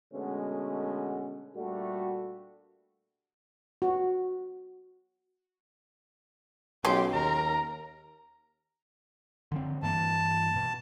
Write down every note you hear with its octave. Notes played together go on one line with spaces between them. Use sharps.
B2 D3 G#3 A3 B3 C#4
A#2 G3 A3 D4 F#4
F#4
B1 C#3 G4 C6
D#2 A#4 A#5
D3 F3 C4
G2 E3 A#3 A5
B2